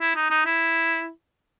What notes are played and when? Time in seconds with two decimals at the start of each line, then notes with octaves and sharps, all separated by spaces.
0.01 E4
0.16 D#4
0.30 D#4
0.46 E4